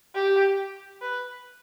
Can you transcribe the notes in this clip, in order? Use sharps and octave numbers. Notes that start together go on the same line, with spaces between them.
G4
B4